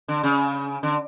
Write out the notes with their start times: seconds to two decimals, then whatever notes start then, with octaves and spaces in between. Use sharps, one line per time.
0.08 D3
0.23 C#3
0.83 D3